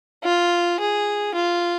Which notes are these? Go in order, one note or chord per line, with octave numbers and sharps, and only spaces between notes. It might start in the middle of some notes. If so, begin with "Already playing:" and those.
F4
G#4
F4